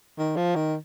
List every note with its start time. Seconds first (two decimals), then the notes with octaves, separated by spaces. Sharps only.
0.19 D#3
0.36 F3
0.55 D#3